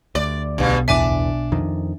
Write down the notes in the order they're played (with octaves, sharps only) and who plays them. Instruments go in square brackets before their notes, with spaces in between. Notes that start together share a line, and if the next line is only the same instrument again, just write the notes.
[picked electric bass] D2 [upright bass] D4 [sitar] D5
[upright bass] B1 [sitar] G2 B2
[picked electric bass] D1 E2 E3 [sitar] D4 [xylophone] E5 G#5 D6
[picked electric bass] F2 D#3